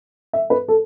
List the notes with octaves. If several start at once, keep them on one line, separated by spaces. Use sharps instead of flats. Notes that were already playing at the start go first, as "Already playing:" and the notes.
E5
B4
A4